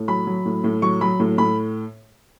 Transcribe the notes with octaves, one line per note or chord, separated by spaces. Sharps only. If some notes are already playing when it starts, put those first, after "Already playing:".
Already playing: A2
F#3 B5
F#3
A2
A2
F#3 C#6
F#3 B5
A2
A2 B5